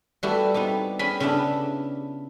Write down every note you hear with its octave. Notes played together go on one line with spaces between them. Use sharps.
G3 A3 B3 E4 F#4 G4
B3 C4 D#4 G4
C#4 G#4 G5 G#5 B5
C#3 B3 C#4 D4 E4 G4